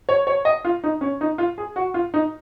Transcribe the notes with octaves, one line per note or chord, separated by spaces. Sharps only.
C#5
C#5
D#5
F4
D#4
C#4
D#4
F4
G#4
F#4
F4
D#4